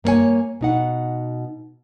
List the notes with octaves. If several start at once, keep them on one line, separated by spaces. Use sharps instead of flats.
G2 A#3 B3 C#5 G#5
B2 D#4 F#5